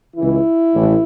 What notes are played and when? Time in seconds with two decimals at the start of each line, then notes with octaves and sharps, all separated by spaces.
0.16 C#2 C#3 E3 E4
0.74 A1 A2 E3